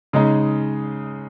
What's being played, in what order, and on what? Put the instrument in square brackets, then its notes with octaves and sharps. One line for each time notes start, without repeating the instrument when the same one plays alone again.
[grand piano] C#3 G#3 D#4